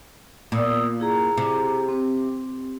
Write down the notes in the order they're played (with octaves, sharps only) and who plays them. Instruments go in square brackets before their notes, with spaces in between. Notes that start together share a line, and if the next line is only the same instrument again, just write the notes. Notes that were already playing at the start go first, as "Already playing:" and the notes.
[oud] A#2 [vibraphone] B3 D#6 E6
[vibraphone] E4 G#4 A#5
[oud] C3
[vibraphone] C4